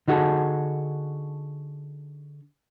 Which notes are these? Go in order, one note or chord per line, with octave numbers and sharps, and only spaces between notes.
D3 D#4 F#4 G#4 A4